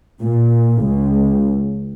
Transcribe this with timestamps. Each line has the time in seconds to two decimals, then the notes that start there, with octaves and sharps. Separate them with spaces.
0.21 A#2
0.84 C#2